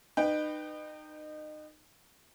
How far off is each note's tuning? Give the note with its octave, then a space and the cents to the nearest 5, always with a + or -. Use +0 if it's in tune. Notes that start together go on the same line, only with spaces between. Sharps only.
D#4 -30 B4 +0 G5 +0